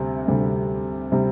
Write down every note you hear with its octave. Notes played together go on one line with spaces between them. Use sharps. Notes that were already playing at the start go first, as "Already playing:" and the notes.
Already playing: D2 C3 G3
D2 C3 G3
C3 G3